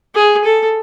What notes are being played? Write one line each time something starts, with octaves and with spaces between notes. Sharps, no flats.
G#4
A4